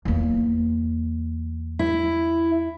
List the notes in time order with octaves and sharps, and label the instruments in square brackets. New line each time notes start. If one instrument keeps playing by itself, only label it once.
[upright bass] E2 A#3
[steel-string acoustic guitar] E4